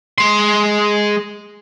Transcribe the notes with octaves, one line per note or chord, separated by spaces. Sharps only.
G#3 C6